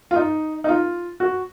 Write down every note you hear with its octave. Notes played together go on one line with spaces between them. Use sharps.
F4
D#4
D#4
F4
F#4